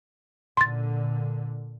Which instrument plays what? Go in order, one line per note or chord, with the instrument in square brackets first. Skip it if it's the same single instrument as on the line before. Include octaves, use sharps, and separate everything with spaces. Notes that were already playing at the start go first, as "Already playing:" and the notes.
[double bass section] A#2 D3 [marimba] C6 A6